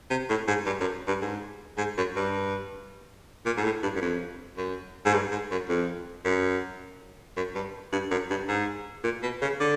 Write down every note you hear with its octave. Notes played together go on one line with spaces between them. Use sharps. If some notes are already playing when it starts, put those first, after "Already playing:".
C3
A2
G#2
G2
F#2
G2
G#2
G#2
F#2
G2
A#2
G#2
A2
G2
F#2
F2
F#2
G#2
G2
G#2
F#2
F2
F#2
F#2
G2
G2
F#2
G2
G#2
A#2
B2
C#3
D3